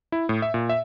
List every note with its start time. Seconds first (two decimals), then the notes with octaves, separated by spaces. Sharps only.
0.12 E4
0.29 A2
0.42 E5
0.54 A#2
0.69 E5